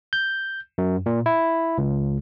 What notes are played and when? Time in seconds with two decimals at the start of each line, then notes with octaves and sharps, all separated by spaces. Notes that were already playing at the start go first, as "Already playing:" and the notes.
0.13 G6
0.78 F#2
1.06 A#2
1.26 E4
1.78 C#2